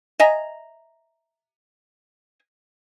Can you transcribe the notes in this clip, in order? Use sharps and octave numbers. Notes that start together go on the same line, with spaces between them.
D#5 E5 G#5 A#5